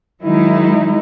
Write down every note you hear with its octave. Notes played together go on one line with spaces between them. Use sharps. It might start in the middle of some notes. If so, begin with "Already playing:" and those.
D#3 F#3 G#3 D#4 E4